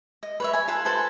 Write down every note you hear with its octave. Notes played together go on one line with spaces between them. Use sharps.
D#5
B4 C#5 E5
G#5 B5
F4 A4 B4
A4 B4 C5 G#5